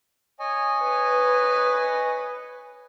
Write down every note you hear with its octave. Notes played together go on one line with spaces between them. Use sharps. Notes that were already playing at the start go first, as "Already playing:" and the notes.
C#5 D#5 G#5
B4